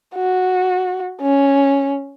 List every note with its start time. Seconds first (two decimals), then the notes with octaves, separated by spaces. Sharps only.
0.15 F#4
1.21 C#4